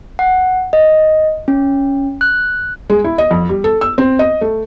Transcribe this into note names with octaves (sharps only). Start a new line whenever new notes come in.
F#5
D#5
C#4
F#6
G#3
E4
D#5
F2
G3
A4
E6
C4
D#5
A3